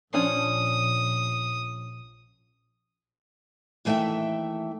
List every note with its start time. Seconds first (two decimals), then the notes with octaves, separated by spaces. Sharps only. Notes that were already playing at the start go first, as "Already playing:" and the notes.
0.14 A#1 F3 C#4 D4 D#6
3.85 D#2 E3 A3 C5 E5 G5